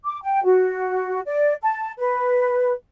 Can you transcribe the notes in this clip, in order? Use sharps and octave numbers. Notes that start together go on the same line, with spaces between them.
D6
G5
F#4
D5
A5
B4